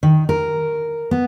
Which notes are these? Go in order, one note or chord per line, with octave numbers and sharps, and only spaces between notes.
D#3
A#4
B3